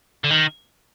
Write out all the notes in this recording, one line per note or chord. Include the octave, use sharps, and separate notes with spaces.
D3
D#3